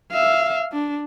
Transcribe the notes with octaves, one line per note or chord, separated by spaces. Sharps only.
E5 F5
D4